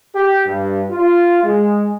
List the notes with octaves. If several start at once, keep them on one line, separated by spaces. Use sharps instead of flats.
G4
G2
F4
G#3